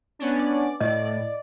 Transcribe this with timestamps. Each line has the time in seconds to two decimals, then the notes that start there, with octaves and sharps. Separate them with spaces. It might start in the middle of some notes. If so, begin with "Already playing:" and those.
0.19 B3 C#4 D4
0.39 D5
0.81 A2 D5 D#5